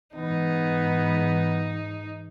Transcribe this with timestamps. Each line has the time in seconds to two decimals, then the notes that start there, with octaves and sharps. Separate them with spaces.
0.15 G#2 E3 B3 D#4